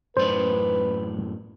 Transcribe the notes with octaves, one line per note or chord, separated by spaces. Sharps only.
F#2 A2 B4 C5 D5